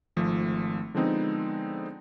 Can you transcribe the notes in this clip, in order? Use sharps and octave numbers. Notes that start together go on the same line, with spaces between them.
G#1 F3 A3
D3 F3 G#3 B3 C4 D#4